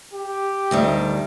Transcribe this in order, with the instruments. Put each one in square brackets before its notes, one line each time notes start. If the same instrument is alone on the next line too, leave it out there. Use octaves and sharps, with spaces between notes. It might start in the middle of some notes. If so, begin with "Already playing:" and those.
[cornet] G4
[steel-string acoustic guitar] D2 D#3 G3